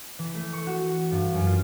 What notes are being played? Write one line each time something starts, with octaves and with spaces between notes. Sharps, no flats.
E3
A3
C#6
F#4
G2
F#2
F4